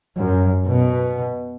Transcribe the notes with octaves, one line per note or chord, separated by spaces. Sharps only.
F#2
B2